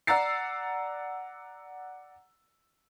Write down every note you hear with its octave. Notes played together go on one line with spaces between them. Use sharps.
D5 F#5 A#5 E6 A6 C7